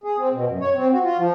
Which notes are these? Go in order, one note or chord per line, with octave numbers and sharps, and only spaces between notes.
G#4
C4
B2
F#2
C#5
C4
F#4
F4
F3